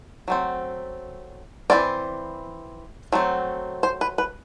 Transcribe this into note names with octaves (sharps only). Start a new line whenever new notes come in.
F#3 A3 C4
E3 A3 C4 D5
F#3 A3 C4
C5
B4
B4